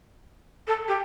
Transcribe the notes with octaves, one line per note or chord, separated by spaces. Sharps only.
A4
G4